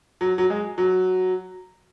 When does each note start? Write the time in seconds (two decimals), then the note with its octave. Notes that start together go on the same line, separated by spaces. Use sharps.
0.21 F#3
0.38 F#3
0.50 G#3
0.78 F#3